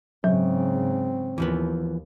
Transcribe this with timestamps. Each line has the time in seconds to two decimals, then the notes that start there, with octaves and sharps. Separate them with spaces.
0.24 G#2 C#3 F#3 C4
1.38 D#2 E3 F3 B3